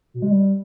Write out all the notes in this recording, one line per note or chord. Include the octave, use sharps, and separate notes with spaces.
B2
G#3
G3